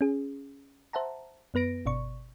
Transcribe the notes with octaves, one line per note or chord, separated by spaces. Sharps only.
C#4 G#4
C5 E5 F#5 A5 A#5
F#2 B3 B4 A#6 D7
G1 B2 D5 C#6